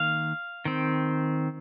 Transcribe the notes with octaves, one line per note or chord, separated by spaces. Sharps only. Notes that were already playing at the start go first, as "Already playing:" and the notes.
Already playing: D#3 A#3 F5
D#3 C4